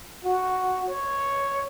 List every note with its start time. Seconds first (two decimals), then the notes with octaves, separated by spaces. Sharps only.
0.25 F#4
0.89 C#5